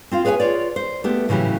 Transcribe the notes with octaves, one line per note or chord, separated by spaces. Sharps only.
C4 F4 F5
G#4 B4 C#5 F5 G#5
F4 C#5 D5
C5
A3 B3 G4
A2 C#3 E3 F#3 G4